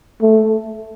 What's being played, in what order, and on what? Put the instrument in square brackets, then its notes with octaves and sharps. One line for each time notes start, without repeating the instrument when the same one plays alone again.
[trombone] A3